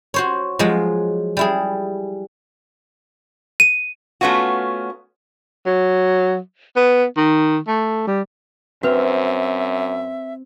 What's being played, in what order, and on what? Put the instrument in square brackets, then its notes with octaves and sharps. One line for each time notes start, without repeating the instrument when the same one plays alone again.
[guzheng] F#4 C5 C#5
F3 F#3 G#3
G3 E4 G#4
[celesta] D#7
[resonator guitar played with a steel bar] A3 B3 C#4 F4 F#4
[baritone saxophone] F#3
B3
D#3
A3
G3
[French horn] F#2 [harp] C4 [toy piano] F#4 B4 [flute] E5